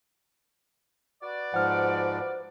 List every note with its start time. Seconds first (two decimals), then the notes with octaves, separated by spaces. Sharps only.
1.23 F#4 B4 D5
1.54 G#2 F3 C5 F#5 F6